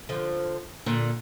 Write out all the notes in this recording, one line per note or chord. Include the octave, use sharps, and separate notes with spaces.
D3 F3
A#2 D3